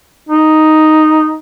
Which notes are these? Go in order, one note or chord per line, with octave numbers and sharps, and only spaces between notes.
D#4